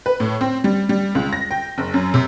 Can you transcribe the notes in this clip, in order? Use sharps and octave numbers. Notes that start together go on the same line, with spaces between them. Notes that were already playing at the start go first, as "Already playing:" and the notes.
B4
A2
C4
G3
G3
C#2
A#6
G5
F#1
F#2
C3